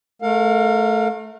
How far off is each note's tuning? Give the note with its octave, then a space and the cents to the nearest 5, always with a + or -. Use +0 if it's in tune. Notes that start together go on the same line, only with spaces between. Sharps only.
A3 -15 A#4 -35 F5 +30